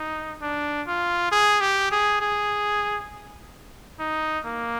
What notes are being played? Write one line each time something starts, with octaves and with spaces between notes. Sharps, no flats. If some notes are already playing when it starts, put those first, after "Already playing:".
Already playing: D#4
D4
F4
G#4
G4
G#4
G#4
D#4
A#3